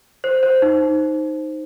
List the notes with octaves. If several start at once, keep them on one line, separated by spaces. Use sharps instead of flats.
C5
C5
D#4